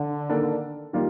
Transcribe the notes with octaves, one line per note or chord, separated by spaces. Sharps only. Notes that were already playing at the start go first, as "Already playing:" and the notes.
Already playing: D3
D#3 A#3 D4 A4 D5
D#3 G3 A#3 F4